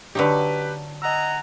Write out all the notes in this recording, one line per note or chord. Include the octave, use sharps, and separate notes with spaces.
D3 F#3 D#4 G4 B4
D#5 F#5 G#5 A#5 E6